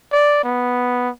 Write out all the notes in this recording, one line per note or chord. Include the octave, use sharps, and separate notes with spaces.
D5
B3